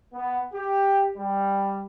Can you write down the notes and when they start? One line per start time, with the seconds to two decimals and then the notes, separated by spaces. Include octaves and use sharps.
0.13 B3
0.53 G4
1.16 G3